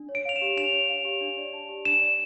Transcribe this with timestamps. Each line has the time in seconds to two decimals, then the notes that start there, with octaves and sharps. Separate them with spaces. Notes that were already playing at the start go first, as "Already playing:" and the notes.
Already playing: D4
0.09 C#5
0.15 D7
0.25 F5 F7
0.36 E7
0.42 G4
0.56 D4 F7
0.73 C#5
0.89 F5
1.05 G4
1.21 D4
1.38 D5
1.53 A5
1.69 G4
1.85 D4 E7
2.01 D5